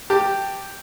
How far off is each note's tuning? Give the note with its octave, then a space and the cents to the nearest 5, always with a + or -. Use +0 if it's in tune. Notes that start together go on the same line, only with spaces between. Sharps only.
G4 +0 A5 +20